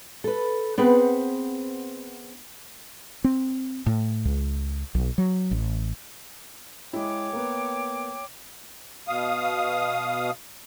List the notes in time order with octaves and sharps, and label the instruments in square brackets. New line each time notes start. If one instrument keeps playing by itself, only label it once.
[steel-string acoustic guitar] A4 B4
B3 C4 G#4 B4 C5 F#5
[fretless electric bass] C4
A2
C#2
B1
F#3
A1
[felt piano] G#3 E4 [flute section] C#5 G5 D6
[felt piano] A#3 B3
[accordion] B2 F5 D#6